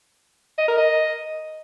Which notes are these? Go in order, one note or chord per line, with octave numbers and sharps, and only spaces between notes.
D#5
A#4
D#5